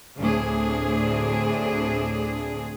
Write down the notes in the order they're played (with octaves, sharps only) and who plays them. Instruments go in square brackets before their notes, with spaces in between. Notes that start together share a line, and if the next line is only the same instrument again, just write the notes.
[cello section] D2 A2 C4 D4 G#4